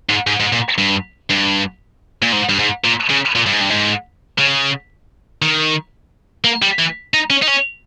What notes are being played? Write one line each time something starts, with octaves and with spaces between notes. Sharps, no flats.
G#2
G#2
G#2
A#2
G2
G2
A#2
G#2
G2
G#2
A#2
C#3
A#2
G2
G#2
G2
G#2
C#3
D#3
A#3
G3
E3
D#4
C#4
D#4
C#4